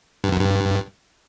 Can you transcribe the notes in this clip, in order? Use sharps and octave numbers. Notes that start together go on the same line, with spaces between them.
G2
F#2
G2